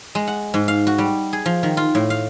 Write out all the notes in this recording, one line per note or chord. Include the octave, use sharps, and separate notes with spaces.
G#3
F#5
G#2
F5
F#4
G3
G#4
F3
D#3
F4
A2
F5